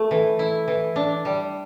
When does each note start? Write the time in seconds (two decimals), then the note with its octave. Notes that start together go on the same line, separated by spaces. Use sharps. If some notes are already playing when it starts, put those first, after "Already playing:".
Already playing: A3
0.11 E3
0.39 E4
0.68 E3
0.96 D4
1.25 G3